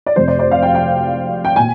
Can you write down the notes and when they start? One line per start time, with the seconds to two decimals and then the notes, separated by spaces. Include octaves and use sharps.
0.06 D5
0.16 F1 F2 C3 C5
0.28 D5
0.39 D5
0.51 F5
0.63 G5
0.75 G5
1.45 G5
1.56 A#2 G#5